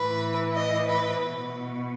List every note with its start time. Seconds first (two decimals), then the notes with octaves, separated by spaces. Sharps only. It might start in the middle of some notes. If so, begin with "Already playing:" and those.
Already playing: A2 E3 B4
0.56 D#5
0.89 B4
1.22 B2